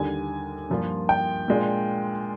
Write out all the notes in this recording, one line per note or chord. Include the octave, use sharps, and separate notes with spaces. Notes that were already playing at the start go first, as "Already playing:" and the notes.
Already playing: D#2 D3 G3 D4 G#5
G2 F3 A#3 F4
G5
A#2 G#3 D4 F4